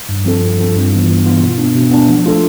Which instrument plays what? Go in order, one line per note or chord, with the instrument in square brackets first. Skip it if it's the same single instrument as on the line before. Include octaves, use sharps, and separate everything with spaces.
[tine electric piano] G2
F3 C4 F4 A4
G2
F3 C4 F4 A4
G2
E3 B3 F4
G2
E3 B3 F4
B2
B3 D4
B2
B3 D4
F3
A3 D4 F4 A4